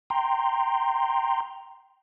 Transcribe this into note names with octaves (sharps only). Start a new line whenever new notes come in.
G5 A#5 C6